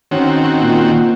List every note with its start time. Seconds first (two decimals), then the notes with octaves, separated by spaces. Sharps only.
0.11 D#3 C4 C#4 F#4
0.62 A#2